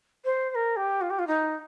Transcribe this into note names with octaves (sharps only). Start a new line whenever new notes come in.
C5
C5
A#4
G4
F4
G4
F4
D#4